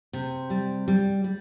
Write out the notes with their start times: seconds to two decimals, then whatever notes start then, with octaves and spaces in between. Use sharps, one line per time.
0.13 C3
0.50 G3
0.88 G3
1.24 G3